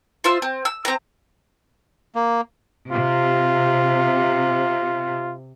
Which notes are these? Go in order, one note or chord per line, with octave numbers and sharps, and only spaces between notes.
F4 C5 E5 E6
C4
E6
C4 A#5
A#3
C3 F4